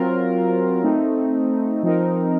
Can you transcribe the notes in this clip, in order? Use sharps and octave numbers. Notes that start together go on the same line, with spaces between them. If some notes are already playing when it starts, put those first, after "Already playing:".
Already playing: F#3 C4 F4 A#4
A3 C4 D#4
F3 C4 D#4 A#4